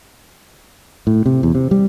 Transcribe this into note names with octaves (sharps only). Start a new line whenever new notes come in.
A2
C3
E2
C3
G3